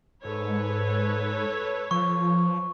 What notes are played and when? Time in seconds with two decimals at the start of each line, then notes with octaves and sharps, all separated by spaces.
0.25 G#2 A4 B4 C#5
1.91 F3 C#6